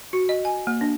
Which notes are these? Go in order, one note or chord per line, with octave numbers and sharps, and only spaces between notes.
F#4
D#5
G#5
A#3
D4